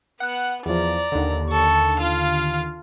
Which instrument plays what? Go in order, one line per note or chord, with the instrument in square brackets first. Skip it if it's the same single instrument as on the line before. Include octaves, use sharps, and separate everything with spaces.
[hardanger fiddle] B3 [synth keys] F#5 F#6
[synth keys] E2 F3 [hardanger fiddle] D5 A#5
[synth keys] D#2 D3
[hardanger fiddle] A4 C#6
F4 F5